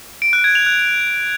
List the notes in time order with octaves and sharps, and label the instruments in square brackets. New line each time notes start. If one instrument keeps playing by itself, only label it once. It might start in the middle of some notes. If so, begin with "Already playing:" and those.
[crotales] D7
F#6
G#6
F7
F#6